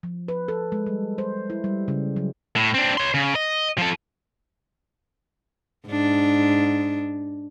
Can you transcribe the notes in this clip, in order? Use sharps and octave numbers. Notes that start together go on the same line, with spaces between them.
F3
B4
A4
G#3
G3
C5
E4
G3
C#3
F#3
A2
C4 D4
C#5 C6
C#3
D#5
F3 A4
G#2 D4